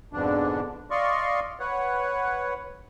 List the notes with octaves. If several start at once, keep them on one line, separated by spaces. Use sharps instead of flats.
F2 G#2 B2 D3 D4
D5 D#5 F5 C6 C#6
B4 C#5 F#5